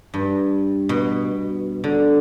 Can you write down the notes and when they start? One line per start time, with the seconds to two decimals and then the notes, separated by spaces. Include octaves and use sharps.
0.14 G2
0.89 B2
1.84 D3